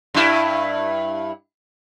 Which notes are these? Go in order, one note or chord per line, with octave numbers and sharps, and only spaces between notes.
G2 E4